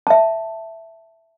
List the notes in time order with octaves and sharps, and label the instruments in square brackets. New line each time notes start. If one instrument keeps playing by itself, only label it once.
[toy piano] E5 A5